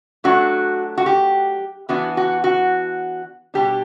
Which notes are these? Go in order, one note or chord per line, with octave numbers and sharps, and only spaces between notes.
F#3 A3 D4 F#4
F#4
G4
E3 B3 D4 F#4
F#4
F#4
B2 G3 D4 G4